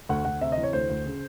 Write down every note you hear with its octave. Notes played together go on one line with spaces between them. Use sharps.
D2 F#5
D2 F#5
C3 E5
D#5
E3
C#5
D2 C5
D2
C#3